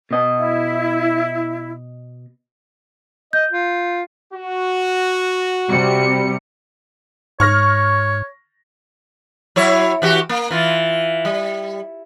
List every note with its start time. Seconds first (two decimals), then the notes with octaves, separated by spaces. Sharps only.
0.11 B2 D#5
0.38 E4
3.33 D#5 G6
3.52 F4
4.33 F#4
5.69 C3 G3 C#7
7.40 G#2 C#5 C#6 F6 A#6
9.56 F#3 E4 C#5
10.02 E3 F#4 G4
10.29 A#3
10.51 E3 F4
11.25 G3